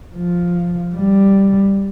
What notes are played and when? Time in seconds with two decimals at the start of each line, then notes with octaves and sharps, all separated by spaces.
0.16 F3
0.95 G3